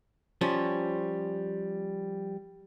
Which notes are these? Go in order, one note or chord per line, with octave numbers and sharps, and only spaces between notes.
F3 G3 C#4